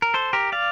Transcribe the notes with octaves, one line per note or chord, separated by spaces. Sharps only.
A#4
A4 C5
G4 A#4
D5 F5